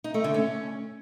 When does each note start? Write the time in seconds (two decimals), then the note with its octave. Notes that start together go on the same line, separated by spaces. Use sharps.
0.04 D#4
0.14 A3
0.24 D3
0.34 C#4